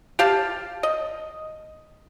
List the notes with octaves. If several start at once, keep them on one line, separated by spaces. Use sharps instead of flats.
G4 F5 A5
D#5